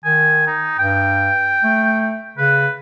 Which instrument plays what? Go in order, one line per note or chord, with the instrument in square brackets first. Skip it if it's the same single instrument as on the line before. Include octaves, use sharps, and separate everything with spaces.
[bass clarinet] D#3 [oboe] G#5
[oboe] D#4
[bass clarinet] G2 [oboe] G5
[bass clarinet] A3
[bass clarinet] C#3 [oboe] B4